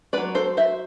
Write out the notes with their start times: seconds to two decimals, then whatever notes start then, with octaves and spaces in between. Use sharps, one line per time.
0.13 F#3 C4 B4 D5
0.35 A4 C5
0.57 C5 E5